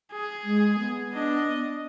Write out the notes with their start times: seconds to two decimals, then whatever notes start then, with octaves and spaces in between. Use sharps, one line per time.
0.12 G#4
0.44 G#3
0.79 B3
1.13 D4 D#5